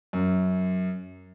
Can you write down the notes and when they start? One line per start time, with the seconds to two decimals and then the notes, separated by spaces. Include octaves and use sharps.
0.13 F#2